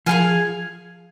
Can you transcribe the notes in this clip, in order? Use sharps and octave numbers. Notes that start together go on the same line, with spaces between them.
F3 G#4 C5 F5 G#5